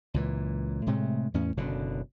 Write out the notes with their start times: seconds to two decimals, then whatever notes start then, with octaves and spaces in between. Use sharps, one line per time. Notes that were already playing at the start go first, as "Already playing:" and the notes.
0.14 C#2 A#2 E3
0.86 A2 C3 G#3 A3
1.34 E2 A2 C#4
1.57 F#1 B2 D3